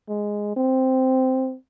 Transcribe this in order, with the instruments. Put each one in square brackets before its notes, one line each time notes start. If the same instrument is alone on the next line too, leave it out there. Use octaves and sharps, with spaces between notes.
[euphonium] G#3
C4